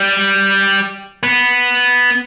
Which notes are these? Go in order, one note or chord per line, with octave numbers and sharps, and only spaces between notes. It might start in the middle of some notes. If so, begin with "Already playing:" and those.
Already playing: G3
B3